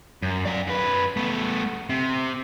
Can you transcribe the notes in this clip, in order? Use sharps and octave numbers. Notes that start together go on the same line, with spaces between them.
F#2
D5 F5
F#2 B4
A3 B3
C3